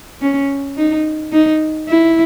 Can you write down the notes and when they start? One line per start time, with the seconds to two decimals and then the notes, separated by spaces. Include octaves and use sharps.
0.21 C#4
0.77 D#4
1.32 D#4
1.88 E4